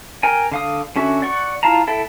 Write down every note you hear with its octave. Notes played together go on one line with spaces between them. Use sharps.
A#4 G5 G#5
D3 F5 D#6
D3 C#4 F#4 E5
D5 F#5 C#6
E4 F4 F5 A5 A#5
E4 A4 E5 G5